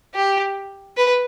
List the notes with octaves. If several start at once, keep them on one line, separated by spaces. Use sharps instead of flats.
G4
B4